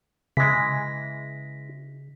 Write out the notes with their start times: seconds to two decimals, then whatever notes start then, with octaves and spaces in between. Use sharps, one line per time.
0.37 C#3 E3 G#3 A#6 B6